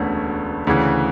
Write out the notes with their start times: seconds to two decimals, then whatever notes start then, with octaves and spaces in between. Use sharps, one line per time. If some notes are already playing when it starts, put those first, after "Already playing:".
Already playing: E1 D2 D3 A3 B3 C#4
0.67 D2 C#3 E3